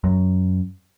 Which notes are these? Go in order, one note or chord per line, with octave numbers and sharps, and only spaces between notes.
F#2